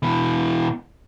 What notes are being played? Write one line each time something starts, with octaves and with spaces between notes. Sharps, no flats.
B2 E3